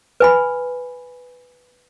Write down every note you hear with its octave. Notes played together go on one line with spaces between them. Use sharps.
B4 G#5 B5